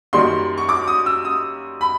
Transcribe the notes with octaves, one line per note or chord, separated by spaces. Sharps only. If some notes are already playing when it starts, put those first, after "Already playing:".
F#2 D#3 G3 A#3 D#4 C6
C#6
D6
D#6
E6
D#6
B5